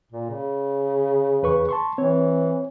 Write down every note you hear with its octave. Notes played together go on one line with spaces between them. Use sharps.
A#2
C#3
E2 B4 C#6
A5 C6 C#6
E3 C4 C#5